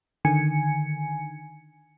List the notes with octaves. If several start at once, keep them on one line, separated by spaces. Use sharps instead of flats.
D3 D#3 G#5 C#7